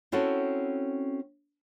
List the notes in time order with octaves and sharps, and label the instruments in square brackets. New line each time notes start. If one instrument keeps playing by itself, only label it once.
[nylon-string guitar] C4 C#4 E4 F#4 A4